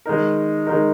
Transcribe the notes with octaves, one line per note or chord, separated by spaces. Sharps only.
D#3 G#3 D#4 A#4
D#3 G#3 D#4 A#4